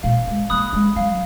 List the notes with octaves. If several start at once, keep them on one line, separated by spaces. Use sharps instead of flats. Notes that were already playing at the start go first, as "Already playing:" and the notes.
A#2 F5
G#3
A#3 B5 D#6 F#6
G#3
F#3 F5